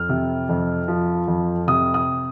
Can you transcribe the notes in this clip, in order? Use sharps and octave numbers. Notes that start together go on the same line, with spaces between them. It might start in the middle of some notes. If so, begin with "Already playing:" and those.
Already playing: F2 F6
C3
F2
F3
F2
C3 D#6
D#6